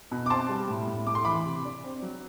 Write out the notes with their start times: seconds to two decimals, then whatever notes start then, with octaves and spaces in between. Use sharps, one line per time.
0.12 B2
0.26 D6
0.30 C4 A5 C6
0.49 G3
0.69 A2
0.87 A2
1.07 A3 D6
1.15 C6
1.25 E3 B5 D6
1.45 C3
1.65 D4
1.84 C4
2.03 F#3